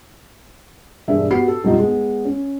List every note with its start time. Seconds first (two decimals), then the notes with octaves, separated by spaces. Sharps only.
1.08 E1 G2 G#4 E5
1.30 B3 F#4 G4 B5 C7
1.48 A4
1.64 B1 F2 G3 D#4 F4 D#5
1.79 G#3 B3
2.25 C#4